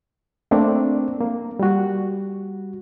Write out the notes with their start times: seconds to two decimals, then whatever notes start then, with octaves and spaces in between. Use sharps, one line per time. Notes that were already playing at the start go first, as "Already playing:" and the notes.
0.51 A3 A#3 C4 D4
1.21 A#3
1.59 G3 F#4